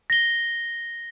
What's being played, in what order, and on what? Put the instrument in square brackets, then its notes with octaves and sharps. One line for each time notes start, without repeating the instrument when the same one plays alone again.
[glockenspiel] A#6 G7